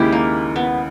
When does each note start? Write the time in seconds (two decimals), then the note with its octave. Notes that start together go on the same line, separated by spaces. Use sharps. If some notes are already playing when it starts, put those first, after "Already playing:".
Already playing: D#2 C#3 G#3 E4 G4
0.12 A#3
0.56 B3